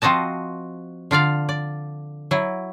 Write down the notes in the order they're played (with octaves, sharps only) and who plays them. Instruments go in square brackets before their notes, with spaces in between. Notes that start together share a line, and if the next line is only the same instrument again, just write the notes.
[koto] F3 C4 F#4 D#5 A5
D3 F4 D5 F5
D5
F#3 E4